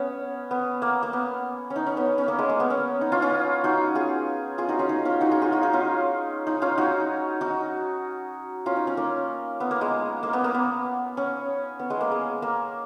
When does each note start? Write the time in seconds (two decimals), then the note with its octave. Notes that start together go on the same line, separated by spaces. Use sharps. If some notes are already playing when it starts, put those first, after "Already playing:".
Already playing: B3 C#4
0.51 B3
0.82 A#3
1.03 A#3
1.13 B3
1.70 C#4
1.76 D#4
1.86 C#4
1.97 B3
2.18 C#4
2.28 A#3
2.39 G#3
2.49 A#3
2.60 B3
2.70 C#4
3.01 D#4
3.12 C#4 F4
3.22 C#4 F4
3.64 D#4 F#4
3.95 F4 G#4
4.58 F4 G#4
4.69 D#4 F#4
4.79 C#4 F4
4.89 D#4
5.05 C#4 F4
5.21 D#4 F#4
5.31 F4 G#4
5.42 F4 G#4
5.52 D#4 F#4
5.63 D#4
5.73 C#4 F4
6.47 D#4
6.62 C#4 F4
6.78 D#4 F#4
7.41 D#4 F#4
8.66 C#4 F4
8.76 D#4
8.87 C#4
8.97 A#3
9.60 B3
9.71 A#3
9.81 G#3
10.23 A#3
10.33 B3
10.44 A#3
10.54 B3
11.17 C#4
11.79 B3
11.90 G#3
12.01 A#3
12.11 G#3
12.42 A#3